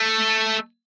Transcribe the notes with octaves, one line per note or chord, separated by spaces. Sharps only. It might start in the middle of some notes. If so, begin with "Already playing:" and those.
Already playing: A3